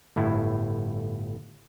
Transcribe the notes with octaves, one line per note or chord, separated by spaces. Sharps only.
G1 A2 E4